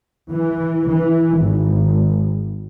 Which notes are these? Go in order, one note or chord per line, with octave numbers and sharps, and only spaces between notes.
E3
E3
G#1